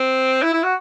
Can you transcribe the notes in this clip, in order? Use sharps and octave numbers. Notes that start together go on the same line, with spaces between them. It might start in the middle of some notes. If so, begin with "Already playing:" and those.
Already playing: C4
E4
E4
F#4